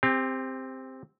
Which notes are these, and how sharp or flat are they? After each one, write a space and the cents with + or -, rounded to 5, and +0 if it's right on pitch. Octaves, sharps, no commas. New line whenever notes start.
C4 +0 G4 +30